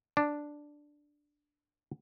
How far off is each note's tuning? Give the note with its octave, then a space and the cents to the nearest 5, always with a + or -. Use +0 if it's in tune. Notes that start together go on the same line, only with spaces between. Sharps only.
D4 +0